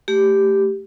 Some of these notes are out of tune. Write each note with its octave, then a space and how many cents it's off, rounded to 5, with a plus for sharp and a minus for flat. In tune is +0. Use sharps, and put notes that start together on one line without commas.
A3 +0 G4 +0